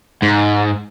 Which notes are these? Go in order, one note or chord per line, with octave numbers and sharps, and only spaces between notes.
G#2